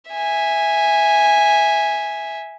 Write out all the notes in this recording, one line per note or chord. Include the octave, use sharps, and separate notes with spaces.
E5 G#5